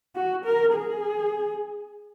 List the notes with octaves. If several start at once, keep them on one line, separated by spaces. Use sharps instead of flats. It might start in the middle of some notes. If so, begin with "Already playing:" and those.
F#4
A#4
G#4